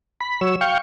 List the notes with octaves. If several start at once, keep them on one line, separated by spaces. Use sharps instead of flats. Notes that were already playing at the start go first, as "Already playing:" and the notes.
B5
F#3 C#5 E6
F5 G5 C#6